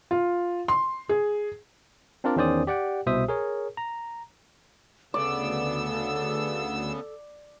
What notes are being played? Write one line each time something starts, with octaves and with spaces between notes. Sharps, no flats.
F4
C6
G#4
C4 D4 F4 A#4 D5
E2 D#3 C#4 C5 D5 D#6
G4 D5 F#5 G5
C2 B2 C5 E5 D#6
G#4 A#4 C#5
A#5
D2 C#3 B3 A4 D5 E6